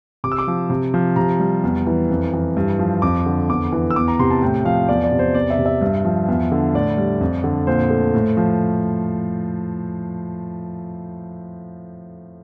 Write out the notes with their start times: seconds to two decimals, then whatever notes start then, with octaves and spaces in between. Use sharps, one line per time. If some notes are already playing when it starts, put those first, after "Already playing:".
0.24 C3 D6
0.32 E6
0.39 D6
0.48 F3
0.70 C3
0.94 F3
1.16 C3 A#5
1.40 G3
1.63 E2
1.87 E3
2.10 F2
2.34 E3
2.57 G2
2.79 F3
3.02 F2 D6
3.26 D3
3.49 E2 D6
3.73 E3
3.90 E6
3.96 E2 D6
4.08 A#5
4.19 C3 C6
4.31 A5
4.42 A2 G5
4.65 F3 F5
4.88 E2 D5
5.04 D5
5.12 C3
5.19 C5
5.35 E2 D5
5.50 E5
5.59 C3
5.66 E5
5.81 G2
6.05 F3
6.28 E2
6.52 D3
6.75 A2 D5
6.98 G3
7.21 F2
7.44 D3
7.67 A#2 C5
7.90 A3
8.15 A2
8.37 F3